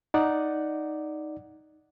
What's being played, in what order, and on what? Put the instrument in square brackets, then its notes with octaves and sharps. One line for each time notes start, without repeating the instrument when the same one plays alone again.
[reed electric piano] D#4 D5 F#5